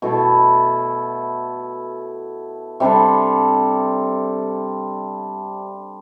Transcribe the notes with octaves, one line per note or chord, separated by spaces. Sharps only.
B2 A3 E4 A4
C3 G3 D4 A4